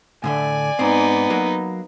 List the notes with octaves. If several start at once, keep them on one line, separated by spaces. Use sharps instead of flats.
A2 D3 A3 D5 G#5
G#2 B3 C4 D#4
F#3 A#3